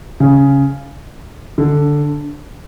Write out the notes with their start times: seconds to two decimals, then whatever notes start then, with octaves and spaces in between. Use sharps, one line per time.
0.20 C#3
1.58 D3